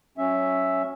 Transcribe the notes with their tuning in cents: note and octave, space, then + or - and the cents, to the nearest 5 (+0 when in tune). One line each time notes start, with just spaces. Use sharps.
F#3 +0 C#4 +0 E5 +0